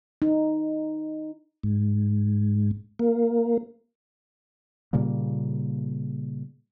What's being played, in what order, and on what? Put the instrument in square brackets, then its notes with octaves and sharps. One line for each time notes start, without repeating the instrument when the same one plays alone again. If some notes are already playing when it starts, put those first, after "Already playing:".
[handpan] D#4
[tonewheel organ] G#2
A#3
[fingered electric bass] A#2 C#3 G3 A#3